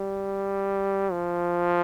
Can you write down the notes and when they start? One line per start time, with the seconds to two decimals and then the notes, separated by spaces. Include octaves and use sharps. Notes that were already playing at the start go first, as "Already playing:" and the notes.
Already playing: G3
1.12 F3